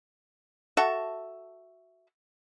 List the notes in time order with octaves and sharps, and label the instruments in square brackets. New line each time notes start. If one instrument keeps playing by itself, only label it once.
[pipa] F#4 A4 E5